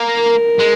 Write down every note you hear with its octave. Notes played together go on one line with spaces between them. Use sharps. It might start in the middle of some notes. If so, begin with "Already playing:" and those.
Already playing: A#3
A#4
G#3